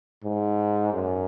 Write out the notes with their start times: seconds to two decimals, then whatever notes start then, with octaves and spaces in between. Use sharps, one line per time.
0.24 G#2
0.93 F#2